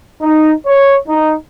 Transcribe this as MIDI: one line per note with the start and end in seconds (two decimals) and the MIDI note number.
0.22 0.51 63
0.67 0.96 73
1.08 1.34 63